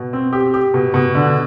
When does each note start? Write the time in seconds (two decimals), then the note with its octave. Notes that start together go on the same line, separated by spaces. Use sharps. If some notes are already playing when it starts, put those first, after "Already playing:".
Already playing: B2
0.13 C4
0.33 G4
0.54 G4
0.74 B2
0.94 B2
1.15 D3